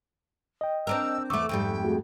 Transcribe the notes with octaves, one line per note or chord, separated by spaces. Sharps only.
D#5 G5
C4 D4 A#4 E6
E2 A3 C#6 D6 E6
F2 G#2 G3 G5
A3 F#4 G#4